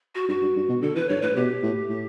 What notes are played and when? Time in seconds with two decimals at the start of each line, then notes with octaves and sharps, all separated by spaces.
0.15 F#4
0.28 G2 F#4
0.41 G2
0.56 G2
0.69 B2
0.82 D3 A4
0.95 E3 B4
1.09 G2 C#5
1.22 A2 B4
1.36 B2 G4
1.63 A2
1.89 A2